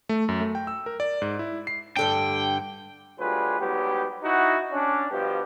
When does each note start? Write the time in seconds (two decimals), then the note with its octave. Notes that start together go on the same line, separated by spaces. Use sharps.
0.09 A3
0.29 F#2
0.40 A3
0.55 G5
0.67 E6
0.86 A#4
1.00 D5
1.22 G#2
1.39 E4
1.67 C7
1.96 G2 D3 D4 G5
3.19 D2 F#3 G3 F4 G#4 B4
3.59 G#2 F#3 G3 B3 G4
4.22 D#4 E4 F#4
4.72 C#4 D4
5.11 G2 B2 F3 B3 G4